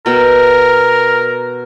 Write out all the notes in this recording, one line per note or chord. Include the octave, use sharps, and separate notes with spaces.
B2 B3 A#4 G5